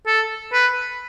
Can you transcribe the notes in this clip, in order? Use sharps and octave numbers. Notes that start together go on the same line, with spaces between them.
A4
B4